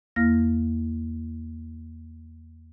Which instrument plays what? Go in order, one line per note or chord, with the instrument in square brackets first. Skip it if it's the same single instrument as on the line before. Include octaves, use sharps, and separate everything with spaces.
[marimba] E2 A#3 E4 F5 F6 A#6